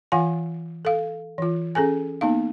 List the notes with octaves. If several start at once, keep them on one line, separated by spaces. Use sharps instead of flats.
E3 F4 F5 F#5 G#5
A4 F5
E3 F4
C#4 G#4 A4 G#5
A#3 B3 D#4 F5